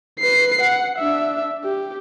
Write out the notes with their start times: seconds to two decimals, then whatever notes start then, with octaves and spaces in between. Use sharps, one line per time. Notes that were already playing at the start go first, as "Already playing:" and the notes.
0.19 B4 C7
0.61 F#5
0.98 D4 E5
1.64 G4